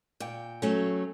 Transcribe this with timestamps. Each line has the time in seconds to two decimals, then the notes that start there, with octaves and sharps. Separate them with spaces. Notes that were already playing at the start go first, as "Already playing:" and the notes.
0.20 A#2 G5
0.62 F#3 A3 C#4